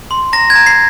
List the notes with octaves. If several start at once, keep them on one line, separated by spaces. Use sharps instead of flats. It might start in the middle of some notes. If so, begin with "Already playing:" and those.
C6
A#5 A#6
G#6
A#5
C7